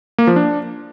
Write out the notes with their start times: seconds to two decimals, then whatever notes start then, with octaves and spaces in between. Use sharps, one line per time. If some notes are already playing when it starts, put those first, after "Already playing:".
0.18 A#3
0.27 F3
0.36 D4